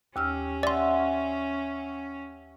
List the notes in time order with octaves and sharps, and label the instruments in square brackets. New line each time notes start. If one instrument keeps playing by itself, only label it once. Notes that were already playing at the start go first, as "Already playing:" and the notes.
[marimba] D#2 E6 F6 [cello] C#4 [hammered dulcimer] G4
[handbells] D5 C6 [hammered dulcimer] E5 F#5